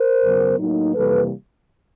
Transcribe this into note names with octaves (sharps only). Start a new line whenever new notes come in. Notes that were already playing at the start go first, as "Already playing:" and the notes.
Already playing: A#4 C5
F#2 C#3 F#3 B3
A2 F#3 A#3 D#4
F2 C3 E3 G3 A#3 A4 B4